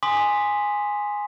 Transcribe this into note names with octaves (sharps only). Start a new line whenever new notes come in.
G#5 C6 D6 D#6 B6